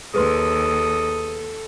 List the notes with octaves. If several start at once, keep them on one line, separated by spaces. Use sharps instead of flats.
D#2 G#4 A4 B4 C6 D#6